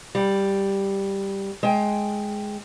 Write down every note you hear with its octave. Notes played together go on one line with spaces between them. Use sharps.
G3
G#3 G5